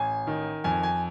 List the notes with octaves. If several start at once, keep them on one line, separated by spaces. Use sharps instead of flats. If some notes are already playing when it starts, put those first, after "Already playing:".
Already playing: A1 G#5
D#3
F2 G#5
G#5